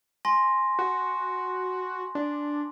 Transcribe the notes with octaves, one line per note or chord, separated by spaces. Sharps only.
G#5 C6 A#6
F#4
D4